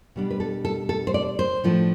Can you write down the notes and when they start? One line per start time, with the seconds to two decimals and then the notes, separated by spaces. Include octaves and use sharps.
0.16 B2 G3 D4
0.31 B4
0.40 A4
0.65 A4
0.89 A4
1.07 C5
1.14 D5
1.39 C5
1.64 A2 F3 A3 D4